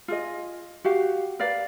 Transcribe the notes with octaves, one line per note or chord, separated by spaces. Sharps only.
F4 G#4 D#5
F#4 G4 F5
A#4 B4 D5 F5